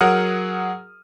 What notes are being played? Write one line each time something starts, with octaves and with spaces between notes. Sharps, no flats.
F#3 G#4 A#4 F#5 D#6 F6